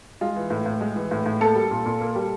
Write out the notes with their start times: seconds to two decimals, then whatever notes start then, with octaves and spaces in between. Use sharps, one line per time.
0.21 G#3 F4
0.36 E3
0.50 A2
0.66 A2
0.81 G#3
0.96 E3
1.11 A2
1.26 A2
1.40 A#3 A4
1.55 G3
1.71 A#2
1.86 A#2
2.01 A#3
2.15 G3